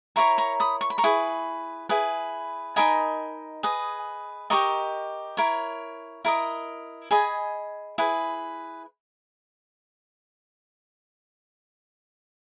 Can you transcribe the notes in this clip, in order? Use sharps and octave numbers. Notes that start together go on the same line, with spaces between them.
E4 A#4 C#5 A#5 C#6
A#5 C#6
B5 D#6
C#6
B5
A#5 C#6
E4 G#4 B4
E4 G#4 B4
D#4 A#4 D#5 G#5 B5
G#4 B4 D#5
G4 A#4 D#5 A#5 C#6
E4 A#4 C#5
E4 A#4 D#5
G#4 D#5 G#5 B5
E4 G#4 B4